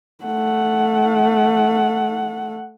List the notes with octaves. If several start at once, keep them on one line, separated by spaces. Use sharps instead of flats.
A3 F#5